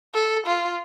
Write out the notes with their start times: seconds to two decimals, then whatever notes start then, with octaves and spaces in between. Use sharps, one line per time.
0.14 A4
0.46 F4